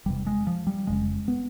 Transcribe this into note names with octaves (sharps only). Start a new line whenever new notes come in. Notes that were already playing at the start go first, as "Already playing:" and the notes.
E1 E2 C3 G3
G#3
F3
G3
F1 F2 C#3 G#3
B3